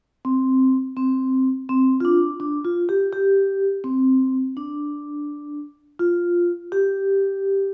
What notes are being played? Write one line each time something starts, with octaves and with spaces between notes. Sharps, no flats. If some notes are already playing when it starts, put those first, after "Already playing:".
C4
C4
C4
F4
D4
D4
F4
G4
G4
C4
D4
F4
G4